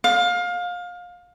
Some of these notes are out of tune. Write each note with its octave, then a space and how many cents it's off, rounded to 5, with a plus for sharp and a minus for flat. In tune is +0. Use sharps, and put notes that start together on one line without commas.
F5 +25